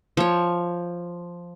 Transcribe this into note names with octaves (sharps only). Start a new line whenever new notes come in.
F3 C#5